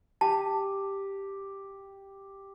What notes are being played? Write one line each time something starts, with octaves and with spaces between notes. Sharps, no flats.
G4 A5